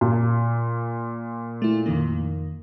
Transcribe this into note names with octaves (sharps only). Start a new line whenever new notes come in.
A#2
A3 E4
F2 D#3 A#3